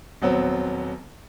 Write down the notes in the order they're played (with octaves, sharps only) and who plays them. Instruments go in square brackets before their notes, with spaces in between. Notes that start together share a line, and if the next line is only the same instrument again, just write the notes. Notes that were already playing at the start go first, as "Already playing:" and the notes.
[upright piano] D#1 F#3 B3 C4